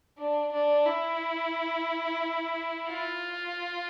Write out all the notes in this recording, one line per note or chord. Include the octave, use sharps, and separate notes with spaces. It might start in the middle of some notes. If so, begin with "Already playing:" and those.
D4
D4
E4
F4